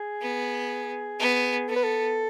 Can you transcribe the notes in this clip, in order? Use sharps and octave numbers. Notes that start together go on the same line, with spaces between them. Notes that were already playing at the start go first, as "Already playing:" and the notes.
Already playing: G#4
B3
B3
B3 A4
B4
A4